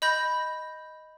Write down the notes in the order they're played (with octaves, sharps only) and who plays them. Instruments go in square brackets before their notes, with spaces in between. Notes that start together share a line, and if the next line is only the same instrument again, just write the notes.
[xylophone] D#5 B5 G6 A#6